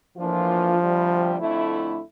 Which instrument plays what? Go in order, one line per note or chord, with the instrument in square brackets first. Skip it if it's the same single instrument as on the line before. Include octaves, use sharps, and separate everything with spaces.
[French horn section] A2 E3 A#3 D4 F4 [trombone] F3
[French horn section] D2 C3 G3
F2 D3 A3 E4